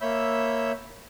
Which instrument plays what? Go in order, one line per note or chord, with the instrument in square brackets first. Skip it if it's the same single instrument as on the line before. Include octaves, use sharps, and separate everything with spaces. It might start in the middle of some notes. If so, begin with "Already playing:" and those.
[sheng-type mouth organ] A#3 C#5 E5 B5 E6 G6